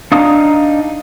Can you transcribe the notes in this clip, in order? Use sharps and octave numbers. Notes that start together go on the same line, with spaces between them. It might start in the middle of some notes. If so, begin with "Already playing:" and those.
D4 D#4 F5 A#5 D#6